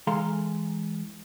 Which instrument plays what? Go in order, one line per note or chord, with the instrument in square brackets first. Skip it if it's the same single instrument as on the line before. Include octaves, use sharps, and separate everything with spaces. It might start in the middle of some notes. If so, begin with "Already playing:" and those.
[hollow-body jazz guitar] E3 G#3 A4 F5 A#5 C6